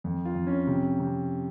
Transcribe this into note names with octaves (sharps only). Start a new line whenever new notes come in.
F2
F4
F2
C#4
C3
C3